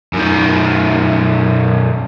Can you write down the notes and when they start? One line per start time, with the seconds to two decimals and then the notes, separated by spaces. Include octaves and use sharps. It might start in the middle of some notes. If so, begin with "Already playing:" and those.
0.13 F#2 D#3